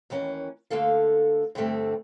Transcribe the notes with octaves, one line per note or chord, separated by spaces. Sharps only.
D#2 D#3 E3 C#4
D2 D3 E3 A#3 A4 F5
G2 D3 G3 A3 C4